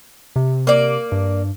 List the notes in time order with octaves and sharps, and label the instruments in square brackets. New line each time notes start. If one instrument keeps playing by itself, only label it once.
[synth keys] C3
[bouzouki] A#3 D5
[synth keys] G2